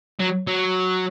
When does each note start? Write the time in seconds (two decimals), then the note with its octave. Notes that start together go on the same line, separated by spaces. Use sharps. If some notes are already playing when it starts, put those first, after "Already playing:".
0.20 F#3
0.47 F#3